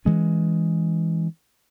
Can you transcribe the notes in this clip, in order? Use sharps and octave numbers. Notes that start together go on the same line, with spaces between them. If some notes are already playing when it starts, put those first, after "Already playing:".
E3 G#3 C#4